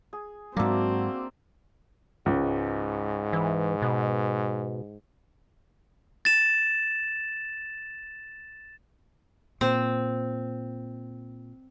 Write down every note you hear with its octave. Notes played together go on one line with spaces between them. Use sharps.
G#4
G#2 F#3 A#3 C4 D4 F#4 E5
C#2 G#2
E3
B2
A6 E7
A#2 C4